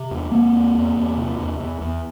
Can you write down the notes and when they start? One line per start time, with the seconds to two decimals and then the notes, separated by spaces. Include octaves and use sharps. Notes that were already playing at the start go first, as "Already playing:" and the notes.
Already playing: C3
0.11 E2
0.31 E2 A#3 C4
0.53 E2
0.75 E2
0.96 E2
1.17 C3
1.38 E2
1.60 E2
1.81 E2